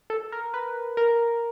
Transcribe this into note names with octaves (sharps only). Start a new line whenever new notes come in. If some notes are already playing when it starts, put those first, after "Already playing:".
A4
A#4
B4
A#4